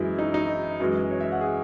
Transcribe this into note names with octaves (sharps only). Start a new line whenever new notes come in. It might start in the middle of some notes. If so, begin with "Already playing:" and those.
Already playing: F#2 E3 G#3 E4
D#4
D#4
F#2 E3 G#3
C#5
E5
F#5
G#4